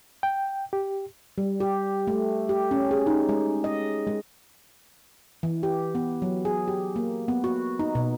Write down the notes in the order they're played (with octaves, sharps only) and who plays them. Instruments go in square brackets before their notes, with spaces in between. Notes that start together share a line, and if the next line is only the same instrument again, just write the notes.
[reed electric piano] G5
G4
[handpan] G3
G4
A3
G4
C#4
G#4
D#4
G#3
D#5
G#3
E3
G4
B3
F#3
G#4
G4
A#3
B3
F#4
D#4
B2